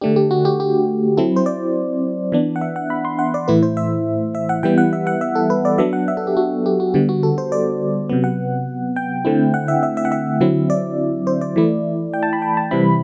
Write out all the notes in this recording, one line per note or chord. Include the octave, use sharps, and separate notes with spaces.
D3 A3 D4 G4
G4
F#4
G4
G4
F#3 C4 E4 A4
C5
D5
E3 B3 D4
F#5
E5
F#5
B5
C6
F#5
D5
A2 E3 A3 E4 B4
C5
E5
E5
F#5
E3 G3 B3 E4 G5
F#5
E5
F#5
E5
A4
B4
D5
F#3 B3 D4 E5
F#5
E5
A4
G4
F#4
G4
F#4
D3 G3 B3 G4
F#4
A4
C5
D5
C3 F#3 B3
F#5
G5
D3 A3 C4 E4
F#5
E5
E5
E5
F#5
E5
D3 F#3 C4 E4
D5
C5
D5
E3 A3 E4
G5
A5
B5
G5
A5
C3 E3 G3 C4 E4 B5